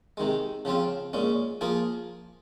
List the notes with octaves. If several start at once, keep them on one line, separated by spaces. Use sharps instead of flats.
C3 D#3 G#3
C#3 F3 C4 F4
A#2 G#3 C#4
F3 A#3 F4 G#4